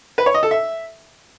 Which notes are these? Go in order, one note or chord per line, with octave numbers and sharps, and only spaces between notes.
B4
C#5
D#5
A4
E5